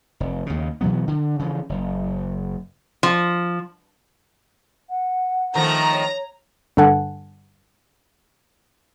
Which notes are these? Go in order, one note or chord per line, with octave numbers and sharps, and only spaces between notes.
F1
D#2 C#3
B2 E3 F#3 B3
D3
C#3 E3 F3
F#1
F3
F#5
D#3 F3 A3 A#5
C#5
G2 D3 A4 F#5 G#5